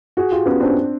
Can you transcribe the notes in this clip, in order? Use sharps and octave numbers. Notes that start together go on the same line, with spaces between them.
F#4 G#4
F4 G4
B3 C#4
C4 D4